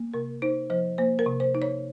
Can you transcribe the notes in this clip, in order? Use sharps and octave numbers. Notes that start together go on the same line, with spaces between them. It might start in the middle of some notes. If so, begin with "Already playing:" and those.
Already playing: A#3
C3 A#4
D#4 C5
F3 C5
A#3 C5
A#4
C3
C5
D#4
C#5